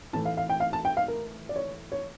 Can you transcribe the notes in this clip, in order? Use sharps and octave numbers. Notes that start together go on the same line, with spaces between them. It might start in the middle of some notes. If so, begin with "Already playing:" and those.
A2 E3 A3 A5
F5
F5
G5
F5
A5
G5
F5
A#4
D5
C#5
C#5